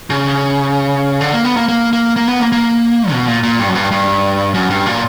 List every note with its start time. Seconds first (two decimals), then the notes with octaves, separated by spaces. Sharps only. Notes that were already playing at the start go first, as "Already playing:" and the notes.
0.10 C#3
1.21 D3
1.33 A#3
1.45 B3
1.57 A#3
1.68 A#3
1.93 A#3
2.16 A#3
2.29 B3
2.40 A#3
2.52 A#3
3.11 B2
3.27 A#2
3.43 A#2
3.59 G2
3.69 F#2
3.75 G2
3.91 G2
4.54 F#2
4.70 G2
4.86 A#2